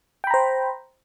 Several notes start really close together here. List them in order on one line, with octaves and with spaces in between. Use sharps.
G5 B5 A#5 C5